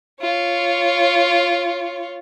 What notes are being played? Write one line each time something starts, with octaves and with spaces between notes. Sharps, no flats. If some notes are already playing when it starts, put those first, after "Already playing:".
F4 C#5